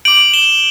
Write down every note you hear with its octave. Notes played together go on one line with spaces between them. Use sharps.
D6 G6 D7 F#7
E7 G7